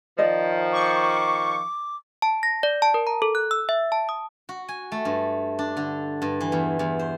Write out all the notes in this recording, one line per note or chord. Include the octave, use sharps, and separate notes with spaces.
D#3 F3 D5 D#5
C#6 D6
A5
A#6
D5
A5
A#4
A#5
A4
F#6
E6
E5
A5
D#6
F#4
G#5
A3
G2
D4
D3
G2
E3
E2
E2
C5